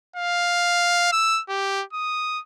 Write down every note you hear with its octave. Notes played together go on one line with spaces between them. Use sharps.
F5
E6
G4
D#6